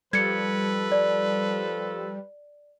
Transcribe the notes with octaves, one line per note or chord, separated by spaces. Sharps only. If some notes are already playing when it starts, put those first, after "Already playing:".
F3 G3 A4 B4 G#6 C#7
D5